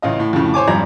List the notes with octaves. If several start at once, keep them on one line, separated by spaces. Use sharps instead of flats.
A1 C#3 F4 D#5
A2
F2 A2 C#3
C5 C#5 G#5 D6
G#1 F2 F3 G3 A#5 G#6